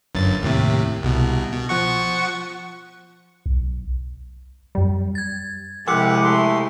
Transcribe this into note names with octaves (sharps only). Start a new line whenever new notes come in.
G1 F#2 A6
D#2 A2 C3
C2 B2
B2
F3 F#5 C#6
B1
F#2 G3
G#6 A6
C3 F3 G#3 E4 G4 F#5 E6
A3 C6